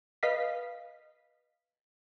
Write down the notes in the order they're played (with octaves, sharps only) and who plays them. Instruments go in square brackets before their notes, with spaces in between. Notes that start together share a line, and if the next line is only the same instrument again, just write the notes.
[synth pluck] B4 D#5 F5 B6